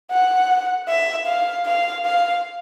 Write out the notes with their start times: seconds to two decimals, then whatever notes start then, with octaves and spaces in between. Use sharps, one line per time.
0.11 F#5
0.88 E5
1.26 F5
1.65 F5
2.05 F5